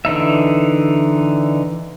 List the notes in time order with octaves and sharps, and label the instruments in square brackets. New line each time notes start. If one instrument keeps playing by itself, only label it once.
[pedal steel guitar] D3 E3 D#4 E5